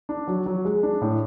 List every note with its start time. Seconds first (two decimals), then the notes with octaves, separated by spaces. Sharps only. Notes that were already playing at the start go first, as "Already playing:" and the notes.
0.09 D4
0.28 F#3
0.46 F#3
0.65 G#3
0.83 D4
1.01 A2